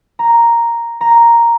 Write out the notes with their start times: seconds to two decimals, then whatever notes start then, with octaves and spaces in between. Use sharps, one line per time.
0.19 A#5
1.01 A#5